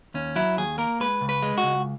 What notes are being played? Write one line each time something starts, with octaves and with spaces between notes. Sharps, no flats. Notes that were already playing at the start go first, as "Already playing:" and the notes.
D#2 C#4
F#3 E4
D#2 G#4
A#3 A#4
G#3 B4
C#2
B4
G#3
F#4
C#2